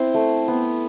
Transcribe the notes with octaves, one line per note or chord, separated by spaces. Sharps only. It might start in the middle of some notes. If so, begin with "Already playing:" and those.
Already playing: C4 E4 C5
A3
B3